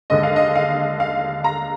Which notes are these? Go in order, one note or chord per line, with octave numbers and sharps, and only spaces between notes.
D#2 D3 G#3 D#5
F5
D#5
F5
F5
A#5